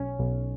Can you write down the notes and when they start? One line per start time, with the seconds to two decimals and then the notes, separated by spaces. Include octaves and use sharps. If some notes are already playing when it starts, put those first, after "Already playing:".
Already playing: B1 C#4
0.19 B1